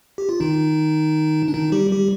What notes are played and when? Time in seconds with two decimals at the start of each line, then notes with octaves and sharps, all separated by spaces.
0.18 G4
0.29 F4
0.40 D#3 D#4
1.48 D4
1.54 D#3 D#4
1.72 G3 G4
1.91 G3 G4